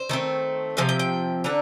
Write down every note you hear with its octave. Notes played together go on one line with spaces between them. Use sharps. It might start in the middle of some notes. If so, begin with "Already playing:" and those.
Already playing: C5
D#3 A3 C4
C3 F3 C4 F5
G5
G5
D3 A3 D4 A#5